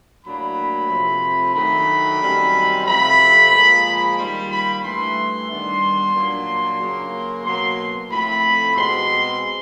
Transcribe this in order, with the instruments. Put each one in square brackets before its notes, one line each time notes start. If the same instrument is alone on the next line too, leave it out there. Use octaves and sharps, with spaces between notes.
[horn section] A2 F#3 A#3 D4 B5
C3 F3 A3 C4
D#3 F#3 A3 D4 B5
F#2 D#3 G3 C4
C3 F3 A3 C4 B5
A#2 F3 G#3
D#3 G3 A#3 C6
B5
G2 E3 A3 C6
G2 D#3 G3 B3 D4
A#2 F#3 A#3 D4
C#3 F#3 A#3
B2 F#3 A#3 C6
A2 F3 A3 C4 B5
B2 G#3 C4 C6